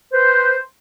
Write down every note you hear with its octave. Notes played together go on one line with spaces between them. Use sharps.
B4 C5